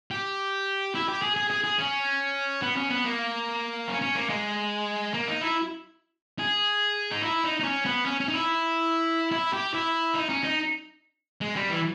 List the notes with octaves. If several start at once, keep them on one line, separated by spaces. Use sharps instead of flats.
G4
E4
G4
G#4
G#4
G#4
G#4
C#4
B3
C#4
B3
A#3
C#4
C#4
A#3
G#3
A#3
D#4
E4
G#4
D#4
E4
D#4
D#4
C#4
B3
C#4
C#4
D#4
E4
E4
G4
E4
D#4
C#4
D#4
G#3
G3
E3